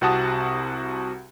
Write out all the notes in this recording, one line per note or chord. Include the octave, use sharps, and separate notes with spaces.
C2 C3 F#4 F#5 A5 D#6